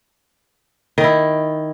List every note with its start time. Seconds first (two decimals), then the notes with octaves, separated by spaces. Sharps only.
0.98 D#3
1.01 D#4
1.04 E4